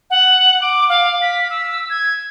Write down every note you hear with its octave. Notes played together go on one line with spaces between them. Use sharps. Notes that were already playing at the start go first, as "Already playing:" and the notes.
F#5
D6
F5
B6
E6
G#6